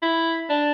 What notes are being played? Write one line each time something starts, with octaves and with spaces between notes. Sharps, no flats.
E4
D4